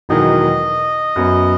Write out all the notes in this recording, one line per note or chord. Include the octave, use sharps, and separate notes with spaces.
E1 E2 D#3 F#3 D#5
F#2 F#3 B3